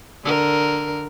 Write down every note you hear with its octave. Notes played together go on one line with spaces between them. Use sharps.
D3 A#4